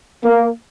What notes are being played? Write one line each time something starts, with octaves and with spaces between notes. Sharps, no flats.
A#3